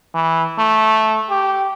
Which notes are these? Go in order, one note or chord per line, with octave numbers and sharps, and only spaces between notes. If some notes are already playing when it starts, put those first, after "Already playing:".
E3
A3
G4